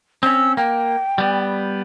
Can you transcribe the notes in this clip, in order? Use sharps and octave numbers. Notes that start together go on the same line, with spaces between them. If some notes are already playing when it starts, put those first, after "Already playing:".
C4 C#4 E6
A#3 G5
G3 B3